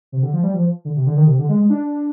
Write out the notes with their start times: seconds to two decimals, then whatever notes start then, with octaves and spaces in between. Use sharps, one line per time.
0.12 C3
0.23 D3
0.33 F3
0.43 G3
0.54 F3
0.85 D3
0.96 C3
1.06 D3
1.17 D#3
1.27 C3
1.39 D3
1.49 G#3
1.59 G#3
1.70 D4